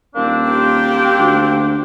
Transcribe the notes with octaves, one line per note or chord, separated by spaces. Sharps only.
D#1 A#3 C4 D4
G4 G5
D2